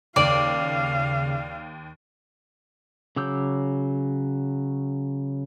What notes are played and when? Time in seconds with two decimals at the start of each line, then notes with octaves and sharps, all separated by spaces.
0.16 D#2 C#3 D5 F5
3.16 C#3 F#3 D6 E6 G6